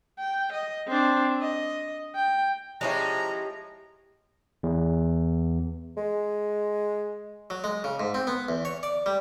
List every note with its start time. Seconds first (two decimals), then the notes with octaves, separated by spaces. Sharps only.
0.19 G5
0.52 D#5
0.88 C4 D4
1.41 D#5
2.15 G5
2.81 F3 G#3 C#4 E4 G4 C#5 A#5
4.63 E2
5.97 G#3
7.50 F#3
7.64 G#3
7.84 C#3
8.00 G#2
8.14 C4
8.27 B3
8.49 E2
8.65 C#5
8.83 D5
9.06 G3